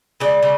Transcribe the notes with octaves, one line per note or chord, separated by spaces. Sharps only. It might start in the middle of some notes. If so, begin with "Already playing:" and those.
C#3 D5
C#3